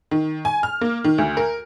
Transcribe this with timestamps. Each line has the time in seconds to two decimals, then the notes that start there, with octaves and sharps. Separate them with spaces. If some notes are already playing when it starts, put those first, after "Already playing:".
0.11 D#3
0.45 G#5
0.63 F6
0.81 A#3
1.04 D#3
1.18 D2
1.37 A#4